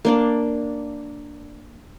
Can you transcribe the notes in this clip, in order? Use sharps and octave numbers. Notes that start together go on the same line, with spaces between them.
A#3 D4 D5